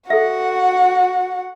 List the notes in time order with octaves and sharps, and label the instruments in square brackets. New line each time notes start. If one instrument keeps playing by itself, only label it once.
[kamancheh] F#4 F#5 [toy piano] A4 E5